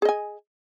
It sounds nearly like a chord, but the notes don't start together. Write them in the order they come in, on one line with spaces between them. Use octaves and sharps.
G#4 D#5 G#5